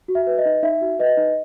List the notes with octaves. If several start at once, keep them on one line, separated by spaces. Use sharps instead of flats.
F#4
E5
B4
D#5
D#4
D#4 E5
F#4
B4 D#5
D#4